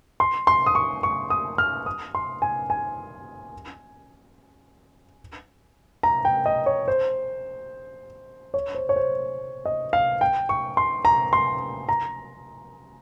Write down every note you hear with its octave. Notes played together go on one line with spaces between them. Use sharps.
C6
C6
D#6
C#6
C#6
D#6
F6
D#6
C6
G#5
G#5
A#5
G5
D#5
C#5
C5
C#5
C5
C#5
C5
D#5
F5
G5
C#6
C6
A#5
C6
A#5